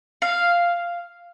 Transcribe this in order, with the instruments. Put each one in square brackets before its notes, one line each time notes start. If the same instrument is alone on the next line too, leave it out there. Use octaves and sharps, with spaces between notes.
[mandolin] F5